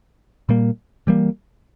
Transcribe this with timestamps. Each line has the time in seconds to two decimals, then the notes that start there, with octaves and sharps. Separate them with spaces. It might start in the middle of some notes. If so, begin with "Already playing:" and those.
0.49 A#2 G3 A#3
1.07 E3 G3 A#3